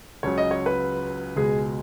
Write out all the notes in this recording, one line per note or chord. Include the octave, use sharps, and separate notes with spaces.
C#2 C#3 F#3 C#5
D#5
C#5
B4
C#2 B2 G#3 G#4